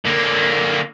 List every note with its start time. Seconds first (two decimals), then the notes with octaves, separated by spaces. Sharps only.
0.05 D3 A#3